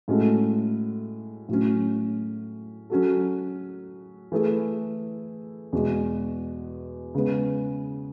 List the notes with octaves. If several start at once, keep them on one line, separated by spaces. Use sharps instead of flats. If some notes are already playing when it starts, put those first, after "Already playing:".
A2 G#3 C#4 F#4 A4
A2 F#3 C#4
F#3 C#4 F#4 A4
E3 A3 E4 G#4
E2 B2 G#3
C#3 G#3 B3